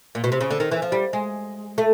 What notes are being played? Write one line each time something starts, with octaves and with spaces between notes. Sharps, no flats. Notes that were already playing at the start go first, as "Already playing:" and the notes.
A#2
B2
C3
C#3
D3
D#3
E3
F3
G3
G#3
A3